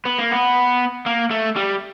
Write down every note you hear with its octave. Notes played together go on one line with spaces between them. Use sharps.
B3
A#3
B3
A#3
A3
G3